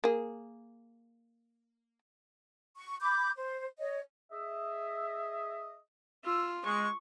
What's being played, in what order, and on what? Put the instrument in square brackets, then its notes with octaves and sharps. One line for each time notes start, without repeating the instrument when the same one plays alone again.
[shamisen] A#3 G#4
[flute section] C#6
B5 D6 G6
C5
C#5 D#5
[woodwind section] G#4 D#5 E5
[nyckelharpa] F4 [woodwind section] E6
[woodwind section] G#3 [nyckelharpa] C#6